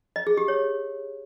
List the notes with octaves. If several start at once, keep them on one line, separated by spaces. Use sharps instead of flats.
D#5
G#4
G4
C#5